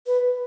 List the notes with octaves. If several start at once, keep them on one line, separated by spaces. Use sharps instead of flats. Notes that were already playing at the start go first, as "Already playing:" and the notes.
B4